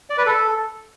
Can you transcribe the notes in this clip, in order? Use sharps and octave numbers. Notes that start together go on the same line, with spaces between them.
D5
B4
A4